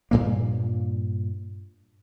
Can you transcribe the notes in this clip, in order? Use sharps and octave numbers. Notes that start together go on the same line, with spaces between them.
G2 A#2 A#3